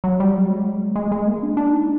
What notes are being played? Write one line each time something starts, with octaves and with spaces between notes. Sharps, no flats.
F#3
G3
F#3
G#3
G#3
G#3
A#3
D4
D4
D#4